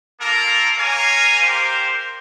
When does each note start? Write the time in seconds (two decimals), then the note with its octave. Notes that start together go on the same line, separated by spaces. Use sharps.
0.21 A#3 F4 A4 A#4
0.78 A#3 A#4 C#5 F5 G#5
1.41 A#3 G4 A#4 C5